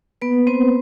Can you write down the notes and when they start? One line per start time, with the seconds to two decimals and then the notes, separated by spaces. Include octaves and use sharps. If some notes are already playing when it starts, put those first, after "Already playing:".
0.22 A#3 B3 B4
0.47 A#3 C4 C5